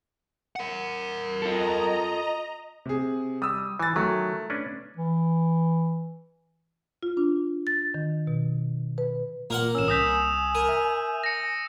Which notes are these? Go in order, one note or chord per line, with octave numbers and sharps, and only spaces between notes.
A#4 F#5
F4 A4 D#5 A#5
C3 G#4
G3 D#6 E6
E3 G#5 A6
D#3 F#3 A3
C#4 D4 B4
E3
F4
D4
A6
D#3
B2
B4
A#2 A#3 A#4 F#5
A1 C#4 E6 E7
C2 G#5 D#6 E6 G6 A#6 B6
A#4 D#7
E5
E6 A#6 C#7